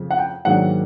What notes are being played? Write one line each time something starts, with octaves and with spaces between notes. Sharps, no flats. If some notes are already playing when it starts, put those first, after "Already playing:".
Already playing: F2 C#3 F3
F#5
G5
G#2 D#3 F#3 A#3 D4 F#5